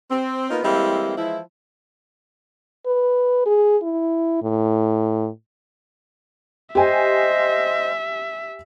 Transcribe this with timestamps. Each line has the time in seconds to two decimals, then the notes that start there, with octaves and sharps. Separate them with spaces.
0.11 C4
0.51 A#3 B3 D#4 F4
0.64 E3 G3 G#3 A#3 C4 E4
1.18 E3 F3 G#3 E4
2.86 B4
3.46 G#4
3.83 E4
4.42 A2
6.75 G4 C5 D#5 E5 G#5 C6